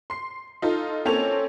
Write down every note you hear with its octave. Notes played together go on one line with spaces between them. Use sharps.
C6 C7
D#4 F4 A4
A#3 C4 C#4 A4 C#5 F7